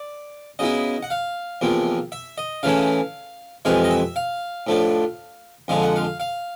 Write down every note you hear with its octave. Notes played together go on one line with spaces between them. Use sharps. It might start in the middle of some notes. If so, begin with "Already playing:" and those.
Already playing: D5
C#3 F#3 B3 E4 D#5
F#5
F5
E2 C3 F3 A#3
E5
D#5
C#3 E3 A3 C#4 E4 F5
F2 C3 E3 G#3 F5
D#5
E5
F5
A2 F3 A3 D4
F2 D3 F3 G#3 F5
F#5
F5
F5